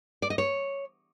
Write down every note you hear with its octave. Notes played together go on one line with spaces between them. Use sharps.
D5
D#5
C#5